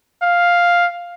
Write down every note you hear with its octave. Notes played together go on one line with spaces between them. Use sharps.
F5